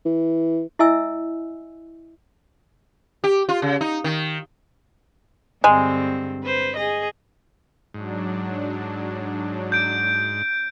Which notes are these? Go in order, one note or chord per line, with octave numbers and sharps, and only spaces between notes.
E3
E4 D#5 E5 G#5 E6
G4
F4
C#3
D#4
D#3
G2 D3 G#3 C4
B4 C5
G#4 D#5
G#2 F#3 D4
G6 D7